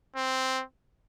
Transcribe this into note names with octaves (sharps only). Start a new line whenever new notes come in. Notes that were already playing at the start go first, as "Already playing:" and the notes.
C4